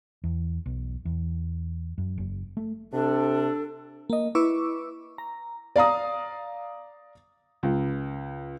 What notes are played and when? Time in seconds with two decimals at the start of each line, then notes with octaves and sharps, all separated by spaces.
0.24 E2
0.66 B1
1.05 E2
1.98 F#2
2.18 F#1
2.57 A3
2.93 C3 D4 A4
4.10 A#3 D#5
4.35 E4 B4 C#6 D6 E6
5.18 A#5
5.76 D5 F5 A#5 D#6
7.63 C#2